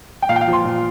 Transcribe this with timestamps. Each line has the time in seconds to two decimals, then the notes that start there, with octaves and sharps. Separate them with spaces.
0.22 G5
0.29 A#2 F5
0.36 G5
0.41 F5
0.48 F3
0.53 C6
0.65 A#2